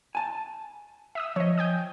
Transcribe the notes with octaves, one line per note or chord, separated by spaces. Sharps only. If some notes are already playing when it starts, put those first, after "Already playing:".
G#5 A5
E5 D#6 E6
F3 C#5 D#5
G5 G#5 D#6